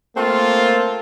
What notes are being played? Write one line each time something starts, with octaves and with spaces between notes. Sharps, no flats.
A3 A#3 C4 F4